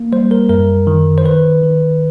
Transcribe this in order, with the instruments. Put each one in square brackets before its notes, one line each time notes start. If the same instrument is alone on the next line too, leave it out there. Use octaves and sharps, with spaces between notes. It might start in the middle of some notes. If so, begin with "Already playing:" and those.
Already playing: [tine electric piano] A#3
G3 C5
A#4
F#2 A#4
D#3
C5
D#3 B4
D#3